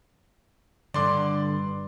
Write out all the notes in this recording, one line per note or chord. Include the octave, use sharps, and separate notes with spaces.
G2 D3 D5 C6 D6